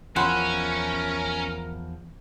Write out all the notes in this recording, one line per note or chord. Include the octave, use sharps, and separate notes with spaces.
E2 F3 C#4 E4 A#4 F#5 C6